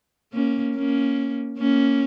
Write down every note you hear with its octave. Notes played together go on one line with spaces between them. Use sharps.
A#3 C#4
A#3 C#4
A#3 C#4